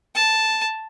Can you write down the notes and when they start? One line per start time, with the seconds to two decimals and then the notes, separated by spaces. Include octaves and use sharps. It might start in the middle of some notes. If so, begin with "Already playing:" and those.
0.15 A5